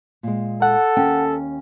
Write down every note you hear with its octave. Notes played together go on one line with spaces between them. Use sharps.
A#2 G#3
A4 F#5
D#2 C#4 G5